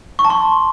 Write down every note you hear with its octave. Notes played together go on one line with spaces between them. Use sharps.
C#6
A5
C6